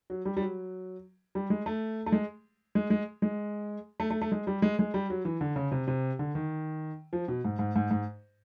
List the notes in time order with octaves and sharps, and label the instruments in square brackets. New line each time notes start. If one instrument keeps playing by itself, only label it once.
[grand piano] F#3
G3
G3
F#3
G3
G#3
A3
A3
G#3
G#3
G#3
G#3
A3
A3
A3
G#3
G3
G#3
G#3
G3
F#3
E3
D3
C#3
C3
C3
D3
D#3
F3
B2
G#2
G#2
G#2
G#2